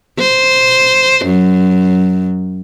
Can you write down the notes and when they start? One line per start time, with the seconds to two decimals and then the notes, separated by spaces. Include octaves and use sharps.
0.19 C5
1.26 F#2